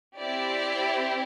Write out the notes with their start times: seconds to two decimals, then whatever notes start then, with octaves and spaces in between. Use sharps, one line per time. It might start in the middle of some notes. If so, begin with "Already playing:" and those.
0.17 C4 E4 G4 D5